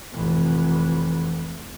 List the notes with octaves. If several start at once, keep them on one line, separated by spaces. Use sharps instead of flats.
F1 E3